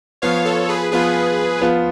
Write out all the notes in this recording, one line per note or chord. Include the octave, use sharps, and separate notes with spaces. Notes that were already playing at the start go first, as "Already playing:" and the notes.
F3 B3 F4 C#5 F5
A4 C#5
G#4 B4
F3 B3 F4 G#4 B4
F3 B3 F4